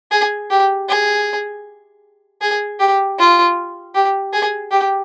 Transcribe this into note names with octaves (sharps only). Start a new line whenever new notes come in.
G#4
G4
G#4
G#4
G4
F4
G4
G#4
G4